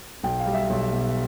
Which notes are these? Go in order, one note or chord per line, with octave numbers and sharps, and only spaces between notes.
B1 G5
F5
G3
E5
B1
B2